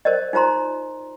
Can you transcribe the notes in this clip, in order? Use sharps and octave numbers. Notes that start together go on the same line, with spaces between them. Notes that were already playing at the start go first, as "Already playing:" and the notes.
A#4 C5 D5 D#5
D#4 F4 C5 A#5 C6